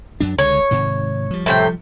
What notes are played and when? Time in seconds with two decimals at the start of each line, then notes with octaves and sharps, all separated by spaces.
0.20 F#2 F#3 D4
0.38 C#2 D3 G#3 C#5
0.71 G#2 C3 D#3
1.31 F3 G3
1.46 A2 C3 G5